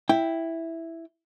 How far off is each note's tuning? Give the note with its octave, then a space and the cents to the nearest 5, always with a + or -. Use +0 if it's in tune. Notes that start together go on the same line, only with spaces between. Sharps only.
E4 +0 G5 +5